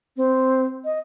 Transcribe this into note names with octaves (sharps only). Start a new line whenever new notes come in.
C4
D#5